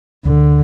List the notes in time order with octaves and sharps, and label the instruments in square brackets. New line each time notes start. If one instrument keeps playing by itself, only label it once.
[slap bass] D2 [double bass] D3